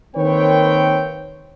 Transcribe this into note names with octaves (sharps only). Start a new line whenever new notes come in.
D#3 A#3 C4 B4 C#5 G5